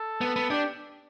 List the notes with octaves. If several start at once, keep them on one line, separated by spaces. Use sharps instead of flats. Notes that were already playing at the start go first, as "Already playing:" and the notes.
Already playing: A4
B3
B3
D4 G4